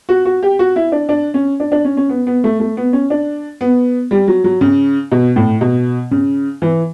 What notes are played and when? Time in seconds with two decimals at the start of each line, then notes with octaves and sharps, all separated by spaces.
0.09 F#4
0.25 F#4
0.43 G4
0.59 F#4
0.76 E4
0.92 D4
1.09 D4
1.34 C#4
1.60 D4
1.72 D4
1.85 C#4
1.97 C#4
2.09 B3
2.27 B3
2.44 A3
2.60 A3
2.77 B3
2.93 C#4
3.10 D4
3.61 B3
4.11 G3
4.28 F#3
4.44 F#3
4.61 C#3
5.12 B2
5.36 A2
5.61 B2
6.11 C#3
6.62 E3